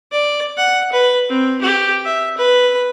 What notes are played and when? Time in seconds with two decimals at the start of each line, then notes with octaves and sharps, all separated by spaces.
0.12 D5
0.57 F#5
0.92 B4
1.29 C4
1.62 G4
2.05 E5
2.37 B4